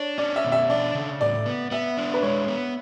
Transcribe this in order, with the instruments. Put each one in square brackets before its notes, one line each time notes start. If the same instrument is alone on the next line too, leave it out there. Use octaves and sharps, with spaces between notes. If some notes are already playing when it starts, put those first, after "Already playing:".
Already playing: [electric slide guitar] D4 [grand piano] C#5
[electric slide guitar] C#4 [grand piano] D5
[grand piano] E5
[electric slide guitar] B2
[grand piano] E5
[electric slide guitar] D4 [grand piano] D5
[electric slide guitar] C#3
[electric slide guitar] A2 [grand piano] D5
[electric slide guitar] B3
[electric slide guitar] B3 [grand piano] E5
[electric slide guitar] D4
[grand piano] B4
[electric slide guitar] G#3 [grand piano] C#5
[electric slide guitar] B3